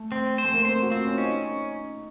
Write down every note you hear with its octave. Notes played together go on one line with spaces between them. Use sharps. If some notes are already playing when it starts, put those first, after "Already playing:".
Already playing: A3
C4
C5
A3
A#3
C4 C5
F#4
C4 F4
C#4
C#4 D#4